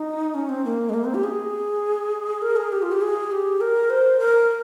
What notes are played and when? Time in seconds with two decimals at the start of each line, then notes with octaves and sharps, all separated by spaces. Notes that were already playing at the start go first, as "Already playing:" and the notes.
Already playing: D#4
0.34 C#4
0.49 C4
0.65 A#3
0.89 G#3
0.94 A#3
1.05 C4
1.14 G4
1.24 G#4
2.42 A#4
2.56 G#4
2.72 G4
2.82 F4
2.92 G4
3.02 G#4
3.31 G4
3.61 A#4
3.90 C5
4.19 A#4